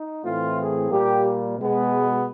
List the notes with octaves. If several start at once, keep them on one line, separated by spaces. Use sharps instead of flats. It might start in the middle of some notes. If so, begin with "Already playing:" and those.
Already playing: D#4
A2 E3 A3 C4 F4
G#4
A#2 G3 A#3 G4
B2 G#3 B3